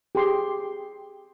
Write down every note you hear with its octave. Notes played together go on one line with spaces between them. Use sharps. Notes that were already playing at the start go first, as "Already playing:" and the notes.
G4 G#4 C6